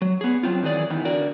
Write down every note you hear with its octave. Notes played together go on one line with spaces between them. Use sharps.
F#3
B3 G#4
F#3 C4 F4
D#3 E3 F#3 G#4 D5
E2 D#3 E3
D3 F#4 A#4 D5